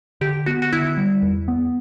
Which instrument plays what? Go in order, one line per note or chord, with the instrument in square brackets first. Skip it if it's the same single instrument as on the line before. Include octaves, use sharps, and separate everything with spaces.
[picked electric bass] D3 [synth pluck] G4
[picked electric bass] B3 [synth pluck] F#4
[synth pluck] F#4
[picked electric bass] D3 [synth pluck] E4
[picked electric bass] G3
E2
B3